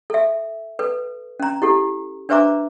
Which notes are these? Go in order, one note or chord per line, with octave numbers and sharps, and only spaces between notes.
A4 E5
A4 B4
C#4 A#5
E4 G4 A4
D4 B4 C5 E5 A#5 D6